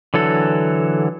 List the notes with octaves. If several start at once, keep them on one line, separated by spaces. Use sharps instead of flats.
D3 E3 F#3 A4